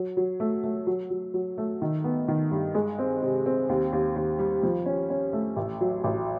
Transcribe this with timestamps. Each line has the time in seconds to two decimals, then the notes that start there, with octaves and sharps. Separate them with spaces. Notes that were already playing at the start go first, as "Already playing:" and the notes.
Already playing: F#3
0.17 F#3
0.40 A3
0.64 A3
0.87 F#3
1.10 F#3
1.34 F#3
1.58 A3
1.82 D#3
2.04 B3
2.28 D#3
2.51 G2
2.74 G#3
2.99 C4
3.23 C3
3.46 C4
3.69 D#2
3.93 D#2
4.16 D#2
4.39 G3
4.63 F3
4.86 C#4
5.10 C#4
5.33 A3
5.56 A1
5.81 F#3
6.04 A1